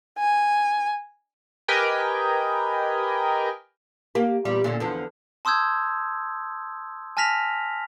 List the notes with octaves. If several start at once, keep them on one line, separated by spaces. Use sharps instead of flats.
G#5
G4 A#4 B4 D#5 G5 G#5
A#3 G4
E2 A#2 G3
A#2 D3 C#4
E2 D3 F3
A5 C6 D#6 E6 G6 G#6
G#5 A5 F6 A#6 B6 F7